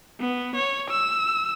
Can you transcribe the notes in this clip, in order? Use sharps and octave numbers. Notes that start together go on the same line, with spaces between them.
B3
C#5
E6